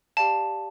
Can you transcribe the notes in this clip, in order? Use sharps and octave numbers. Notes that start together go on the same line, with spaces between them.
G4 D5 F5 A5